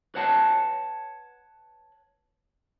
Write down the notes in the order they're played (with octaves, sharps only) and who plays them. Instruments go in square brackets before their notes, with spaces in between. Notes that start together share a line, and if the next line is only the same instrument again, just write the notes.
[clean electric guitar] B4 C#5 F#5 A5